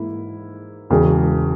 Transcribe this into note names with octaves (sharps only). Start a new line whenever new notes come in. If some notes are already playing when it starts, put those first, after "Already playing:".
Already playing: G#2 E3 A#3 E4
E1 E2 C#3 G#3